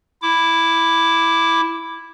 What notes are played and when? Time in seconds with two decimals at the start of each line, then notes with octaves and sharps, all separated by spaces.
0.22 E4 D6